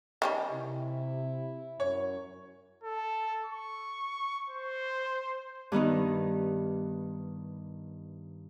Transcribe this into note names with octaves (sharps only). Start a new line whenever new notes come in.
D#3 G3 C#4
C3 E4
F#2 C#5
A4
C#6
C5
G2 D#3 B3 D#4